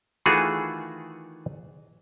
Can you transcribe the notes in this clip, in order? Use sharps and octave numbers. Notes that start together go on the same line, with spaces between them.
D#3 E3 A3 F4 F#4 G#4